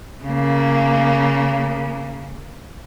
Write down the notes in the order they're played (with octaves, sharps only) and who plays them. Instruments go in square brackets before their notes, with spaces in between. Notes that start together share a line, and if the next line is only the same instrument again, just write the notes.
[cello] C#3 A#3